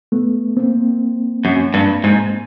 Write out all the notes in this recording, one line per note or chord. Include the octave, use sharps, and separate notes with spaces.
A3 B3
A#3 C4
F#2
G2
G#2